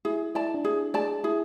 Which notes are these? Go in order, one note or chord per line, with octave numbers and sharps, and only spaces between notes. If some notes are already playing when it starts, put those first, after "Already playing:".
E4 G#4
E4 D5 A5
D4
E4 G#4
G#4 D5 A5
E4 G#4